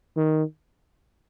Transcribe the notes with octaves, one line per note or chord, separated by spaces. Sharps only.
D#3